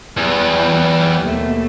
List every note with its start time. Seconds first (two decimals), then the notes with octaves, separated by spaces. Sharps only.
0.17 E2 E3 F#3 G3
1.23 D#2 B2 A3